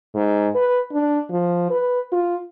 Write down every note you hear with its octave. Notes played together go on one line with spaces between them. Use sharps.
G#2
B4
D4
F3
B4
F4